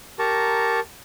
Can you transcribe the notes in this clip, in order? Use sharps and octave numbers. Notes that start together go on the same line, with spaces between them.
G4 A#4 A5 A#5 C#6